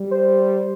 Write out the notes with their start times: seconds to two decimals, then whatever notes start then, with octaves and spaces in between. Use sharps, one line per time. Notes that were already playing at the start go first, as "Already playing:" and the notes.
Already playing: G3
0.11 C5